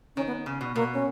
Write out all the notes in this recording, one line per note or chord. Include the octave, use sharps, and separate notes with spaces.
D#3 C#4
B3
C#3
B2
B2 A#3
C#4